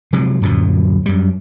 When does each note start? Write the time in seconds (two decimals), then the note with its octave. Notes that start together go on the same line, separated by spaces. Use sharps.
0.13 C3 F3 F#3 G#3
0.42 D1 F#2 A#2 F3
1.06 F#2 G3